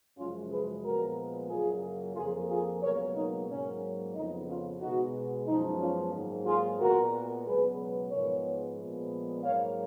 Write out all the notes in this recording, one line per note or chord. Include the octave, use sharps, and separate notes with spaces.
F#2 C#3 F3 G#3 C#4 F4
G#4 B4
A#2 F3 G#3 B3 F#4 A#4
F#2 C#3 F#3 A#3 F4 G#4
F2 F3 A#3 F4 G#4
F4 G#4
C#2 B2 F#3 A#3 A#4 C#5
D#4
G#2 F#3 A#3 C#4
F2 C#3 F3 B3 D#4
C#4 F4
B2 G#3 B3 D#4 F#4
F#2 F3 G#3 B3 D#4
C#4 F4
G#2 D#3 F#3 A#3
F4 G#4
A#2 G#3 B3 F#4 A#4
C#2 B2 F#3 B3 G#4 B4
G#2 F3 G#3 B3 A#4 C#5
A#2 F3 G#3 B3
G#2 F#3 A#3 C#5 F5